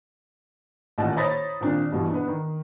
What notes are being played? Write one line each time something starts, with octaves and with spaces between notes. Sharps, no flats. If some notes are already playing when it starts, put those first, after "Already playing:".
A1 A#2 D#3 F#5 A5
C5 C#5 A#5 B5 D#6 A6
A#2 D#3 C4 D4
G2 B2 E3
B3 D4
D#3